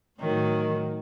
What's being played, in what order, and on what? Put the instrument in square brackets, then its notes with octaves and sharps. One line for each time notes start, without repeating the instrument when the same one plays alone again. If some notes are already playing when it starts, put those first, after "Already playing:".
[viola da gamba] A2 D#3 F#3